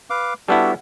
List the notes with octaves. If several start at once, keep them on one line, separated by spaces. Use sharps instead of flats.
B4 F5 D6
G3 B3 D4 E4 F#4 A4